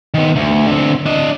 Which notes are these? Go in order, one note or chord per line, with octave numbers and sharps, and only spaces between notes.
D#3 B3
D2
D3 C4
D4 D#5